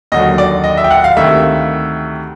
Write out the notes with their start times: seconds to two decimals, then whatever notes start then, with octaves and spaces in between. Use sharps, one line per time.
0.12 D#2 D3 F#3 D#5
0.38 D5
0.64 D#5
0.77 E5
0.84 G5
0.91 F#5
1.04 F5
1.17 D2 C3 D#3 E5